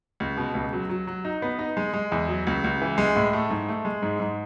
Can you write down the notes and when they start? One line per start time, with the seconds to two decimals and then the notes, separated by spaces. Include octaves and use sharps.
0.20 C#2
0.37 B2
0.55 C#2
0.73 F#3
0.89 F#3
1.07 F#3
1.25 D#4
1.42 B3
1.59 D#4
1.77 G#3
1.94 G#3
2.12 E2
2.28 F#3
2.47 C#2
2.64 C#2
2.82 E3
2.98 G#3
3.16 A2
3.33 A3
3.50 G#2
3.68 A3
3.85 G#3
4.02 G#2
4.20 G#2